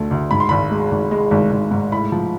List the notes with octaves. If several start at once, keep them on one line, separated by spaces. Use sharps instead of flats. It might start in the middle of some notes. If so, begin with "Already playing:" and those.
Already playing: D2 D3 A3
D2
G#2 B5
C6
G#1 B5
G#3
G#1
G#3
G#1
G#1
G#2
A2 B5
F3